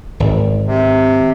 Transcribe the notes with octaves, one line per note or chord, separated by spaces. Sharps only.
G#1
C3